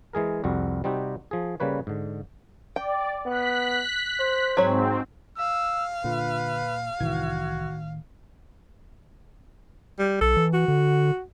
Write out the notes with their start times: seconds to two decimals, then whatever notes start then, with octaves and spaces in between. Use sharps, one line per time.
0.13 E3 G#3 G#4 A#4
0.44 C2 F2 G3 F#4
0.84 C3 G3 C4 D#4 F#4 G4
1.31 F3 G#4
1.60 C#3 G3 A#3 B4 C#5
1.87 G#2 D3
2.76 D5 G5
3.26 B3 F#6 B6
4.20 C5
4.57 G#2 F#3 C4 C#5
5.38 F5 E6
6.04 A#2 D3 F4 B4
7.00 C2 A2 D#3 E3 F#4 G#6
9.99 G3
10.21 B1 A4
10.37 E3
10.53 F#4
10.68 D3